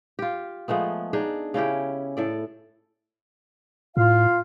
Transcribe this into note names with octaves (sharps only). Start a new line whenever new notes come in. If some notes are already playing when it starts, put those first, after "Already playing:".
F4 G4
F3 G#3 A3 B3
D4 D#4 G#4
C#3 C#4 E4 G4
A2 A4 D5
A2 F4 F5